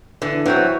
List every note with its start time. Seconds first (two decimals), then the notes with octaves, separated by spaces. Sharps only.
0.22 D3 E3
0.46 E3 F#3 C4 F#4